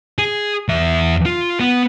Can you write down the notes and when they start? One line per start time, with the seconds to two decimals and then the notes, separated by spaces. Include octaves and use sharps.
0.18 G#4
0.68 E2 E5
1.26 F4
1.60 B3